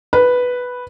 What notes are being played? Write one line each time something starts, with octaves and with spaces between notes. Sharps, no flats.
B4